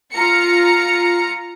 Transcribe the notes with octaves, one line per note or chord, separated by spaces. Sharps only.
F4 A#5 C#7